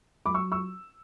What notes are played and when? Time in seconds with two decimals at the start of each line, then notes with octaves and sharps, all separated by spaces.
0.26 F#3 B5 D6
0.34 C#6 E6
0.52 C#6 E6